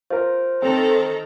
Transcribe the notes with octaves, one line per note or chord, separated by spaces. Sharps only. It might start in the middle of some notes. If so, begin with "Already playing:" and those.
F4 A#4 C5
D#3 C4 A4 A#5